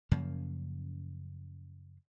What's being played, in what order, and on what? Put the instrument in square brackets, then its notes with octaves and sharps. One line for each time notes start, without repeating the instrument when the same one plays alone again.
[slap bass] F#2 C#3 F3 A#3